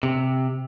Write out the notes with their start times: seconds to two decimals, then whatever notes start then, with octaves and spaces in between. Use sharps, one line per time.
0.03 C3